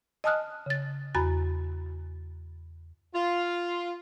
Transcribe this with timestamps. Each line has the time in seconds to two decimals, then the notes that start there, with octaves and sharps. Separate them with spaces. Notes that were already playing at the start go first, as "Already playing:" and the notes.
0.24 D#5 G#5 A5 D#6 F6 F#6
0.66 C#3 A6
1.15 E2 F#4 A#5 B5 A6
3.14 F4